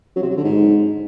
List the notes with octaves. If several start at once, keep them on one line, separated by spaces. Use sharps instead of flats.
F#3
C3
F#3
D3
G#2